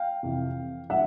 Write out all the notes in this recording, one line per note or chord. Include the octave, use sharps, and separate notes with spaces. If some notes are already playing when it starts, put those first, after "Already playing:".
Already playing: F5 G5
F2 C3 E3
D3 F#3 A3 E5 F#5